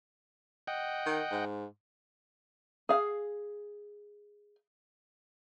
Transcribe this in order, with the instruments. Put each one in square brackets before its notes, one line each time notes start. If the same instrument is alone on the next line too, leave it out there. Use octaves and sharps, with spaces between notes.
[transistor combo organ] D#5 F#5 G5
[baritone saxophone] D#3
G#2
[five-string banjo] G#4 F5